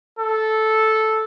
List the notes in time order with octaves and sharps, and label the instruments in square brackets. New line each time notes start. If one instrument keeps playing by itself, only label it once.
[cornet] A4